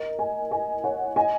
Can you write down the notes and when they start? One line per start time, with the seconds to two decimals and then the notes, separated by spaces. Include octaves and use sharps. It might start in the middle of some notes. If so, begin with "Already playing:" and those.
Already playing: A#4 D#5
0.19 D#5 G#5
0.51 D#5 G#5
0.84 C#5 F#5
1.16 D#5 G#5